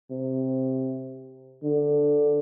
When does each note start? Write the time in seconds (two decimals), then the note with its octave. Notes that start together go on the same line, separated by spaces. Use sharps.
0.11 C3
1.64 D3